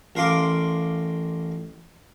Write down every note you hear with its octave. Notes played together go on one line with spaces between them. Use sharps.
A1 A#4 F5 C6 D6